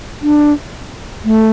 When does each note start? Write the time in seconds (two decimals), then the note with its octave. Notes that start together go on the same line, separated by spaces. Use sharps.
0.22 D4
1.25 A3